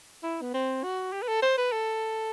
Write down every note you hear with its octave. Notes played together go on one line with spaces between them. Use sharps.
E4
B3
C4
F#4
G4
B4
A4
C5
B4
A4